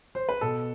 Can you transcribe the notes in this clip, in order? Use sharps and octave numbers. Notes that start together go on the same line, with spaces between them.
C5
B4
B2 A4